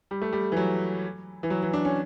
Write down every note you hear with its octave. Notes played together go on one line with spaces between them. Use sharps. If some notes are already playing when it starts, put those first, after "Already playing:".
G3
A3
G3
E3
F#3
E3
F#3
E3
D4
C#4